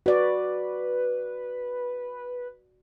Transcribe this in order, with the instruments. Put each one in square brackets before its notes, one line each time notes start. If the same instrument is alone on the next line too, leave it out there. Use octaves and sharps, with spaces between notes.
[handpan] F#4 D5 [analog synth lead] B4